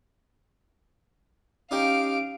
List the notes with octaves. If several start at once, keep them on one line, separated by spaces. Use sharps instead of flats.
C#4 D#4 G4 F5 D7